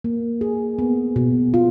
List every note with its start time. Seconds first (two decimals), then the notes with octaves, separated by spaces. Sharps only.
0.04 A#3
0.41 G#4
0.79 B3
1.16 B2
1.54 F4